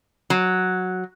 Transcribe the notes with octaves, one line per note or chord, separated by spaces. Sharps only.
F#3